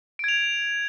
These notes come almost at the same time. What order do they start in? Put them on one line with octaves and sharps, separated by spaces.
D7 G#6 F7